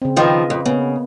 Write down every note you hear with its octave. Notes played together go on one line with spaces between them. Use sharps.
C#3 C4
D#3 F3 C4 B4 D#5 F5
F2
C#3 A#3 B3